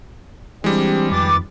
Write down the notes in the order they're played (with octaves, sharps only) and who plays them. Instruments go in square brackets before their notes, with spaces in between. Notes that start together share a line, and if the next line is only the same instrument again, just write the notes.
[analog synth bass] E3 [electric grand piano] G3 G#3 [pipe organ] C4 D4 G4
[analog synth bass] F2 [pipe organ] D#3 B4 A6 [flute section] D6